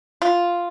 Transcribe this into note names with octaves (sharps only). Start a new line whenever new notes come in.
F4